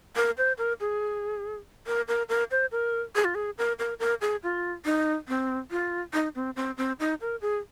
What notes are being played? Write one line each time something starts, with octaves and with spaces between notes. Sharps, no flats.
A#4
C5
A#4
G#4
A#4
A#4
A#4
C5
A#4
G#4
F4
G#4
A#4
A#4
A#4
G#4
F4
D#4
C4
F4
D#4
C4
C4
C4
D#4
A#4
G#4